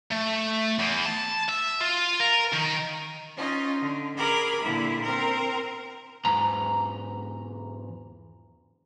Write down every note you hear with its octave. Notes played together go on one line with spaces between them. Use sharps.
A3
E2
A5
E5
F4
A#4
D#3
C#4 D#4 F4
D3
G#4 A#4 B5 D6
A#2 D3 E4
C4 A#4
E2 G#2 A#5